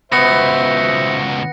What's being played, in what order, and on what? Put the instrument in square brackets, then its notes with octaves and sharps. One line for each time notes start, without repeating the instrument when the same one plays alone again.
[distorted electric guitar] C#2 B2 [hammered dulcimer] B3 [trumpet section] C5 E5 [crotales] A#6 C#7